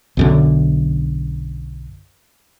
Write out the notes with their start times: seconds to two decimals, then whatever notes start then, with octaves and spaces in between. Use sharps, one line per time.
0.17 B1 F#2 D3